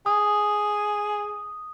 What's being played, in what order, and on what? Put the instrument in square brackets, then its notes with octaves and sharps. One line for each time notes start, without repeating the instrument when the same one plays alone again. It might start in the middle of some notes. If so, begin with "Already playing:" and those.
[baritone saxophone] G#4 [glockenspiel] D#6